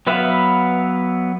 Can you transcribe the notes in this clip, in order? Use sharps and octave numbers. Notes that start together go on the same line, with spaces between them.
F#3 B3 B4 E5 F5